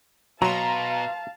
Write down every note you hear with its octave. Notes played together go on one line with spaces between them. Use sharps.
B2 F#3 F5 A5 A#5 C6